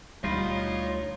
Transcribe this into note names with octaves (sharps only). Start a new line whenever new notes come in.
D2 G3 D#4 F4 C#5 B5